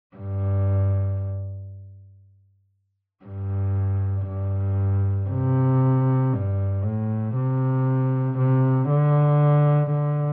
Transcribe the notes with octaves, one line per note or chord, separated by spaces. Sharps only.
G2
G2
G2
C3
G2
A2
C3
C3
D3
D3